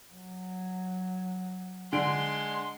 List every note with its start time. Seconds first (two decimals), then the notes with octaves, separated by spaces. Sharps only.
0.12 F#3
1.93 D3 G#3 C6 D7